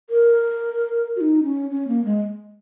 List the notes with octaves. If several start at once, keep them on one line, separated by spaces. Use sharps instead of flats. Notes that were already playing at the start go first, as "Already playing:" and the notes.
A#4
F#4
D#4
C#4
C#4
A#3
G#3